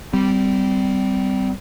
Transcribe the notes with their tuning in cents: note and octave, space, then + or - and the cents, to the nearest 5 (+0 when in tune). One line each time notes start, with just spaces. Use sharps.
G3 -10 C4 -25